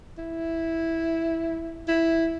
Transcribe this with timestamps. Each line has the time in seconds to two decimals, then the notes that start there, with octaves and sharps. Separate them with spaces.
0.18 E4
1.88 E4